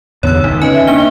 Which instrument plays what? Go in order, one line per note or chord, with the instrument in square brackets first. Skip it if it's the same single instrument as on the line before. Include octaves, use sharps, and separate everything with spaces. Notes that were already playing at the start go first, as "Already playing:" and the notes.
[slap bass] E2 D3 B3 [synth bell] C#5 E6
[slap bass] C#2 D#3 [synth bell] D#4
[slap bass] C#4 [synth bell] B4 D#5 G#5
[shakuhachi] E5
[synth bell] A#3 D4 G7